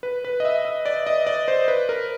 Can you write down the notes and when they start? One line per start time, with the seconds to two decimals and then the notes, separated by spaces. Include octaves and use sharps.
0.03 B4
0.25 B4
0.40 D#5
0.45 E5
0.65 E5
0.86 D5
1.07 D#5
1.27 D5
1.48 C5
1.68 B4
1.89 A#4